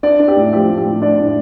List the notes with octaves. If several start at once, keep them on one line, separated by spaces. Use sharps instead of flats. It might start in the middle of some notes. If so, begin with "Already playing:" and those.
D4 D5
D4
G4
A2
F3 G4
A2
G4
A2
D4 D5
A2